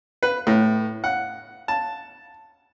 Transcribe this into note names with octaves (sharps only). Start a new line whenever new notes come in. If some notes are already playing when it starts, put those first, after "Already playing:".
B4
A2
F#5
A5